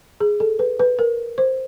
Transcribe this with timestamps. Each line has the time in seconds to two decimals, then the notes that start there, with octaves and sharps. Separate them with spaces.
0.20 G#4
0.40 A4
0.59 B4
0.79 B4
0.99 A#4
1.38 C5